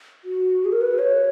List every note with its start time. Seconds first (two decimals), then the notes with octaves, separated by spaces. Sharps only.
0.25 F#4
0.65 G#4
0.72 A#4
0.81 B4
0.99 C#5